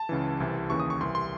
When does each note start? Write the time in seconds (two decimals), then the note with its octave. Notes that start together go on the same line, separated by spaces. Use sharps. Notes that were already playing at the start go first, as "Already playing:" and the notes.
Already playing: A5
0.09 C#2 C#3 E3
0.40 C2 C3 E3
0.70 D#2 C#3 E3 C#6
0.80 D#6
0.90 C#6
1.01 C2 C3 E3 C6
1.15 C6